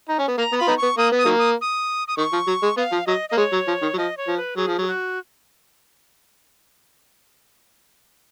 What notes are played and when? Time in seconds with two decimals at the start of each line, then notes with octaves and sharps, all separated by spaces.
0.09 D#4
0.19 C#4
0.28 B3
0.38 A#3 A#5
0.53 B3
0.58 F4 B5
0.67 B3 D#4
0.77 C#6
0.83 B3
0.98 A#3 D#6
1.12 B3
1.18 D#6
1.25 D#3 F#3 A#3
1.39 D#6
1.61 D#6
2.08 D#6
2.17 D#3 C#6
2.33 F3
2.47 F#3
2.63 G#3
2.77 B3 F5
2.92 F3
3.07 F#3 D#5
3.29 A#3 D#5
3.37 G#3 C#5
3.52 F#3
3.68 F3
3.82 D#3
3.93 F#3
3.97 F3 D#5
4.17 C#5
4.27 F3
4.37 B4
4.57 F#3 G#4
4.68 F3
4.78 F#3 G#4
4.87 F#4